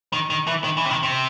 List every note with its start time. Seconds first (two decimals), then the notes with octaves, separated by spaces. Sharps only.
0.13 D#3
0.30 D#3
0.47 E3
0.64 D#3
0.77 E3
0.85 C3
0.90 D#3
1.03 C3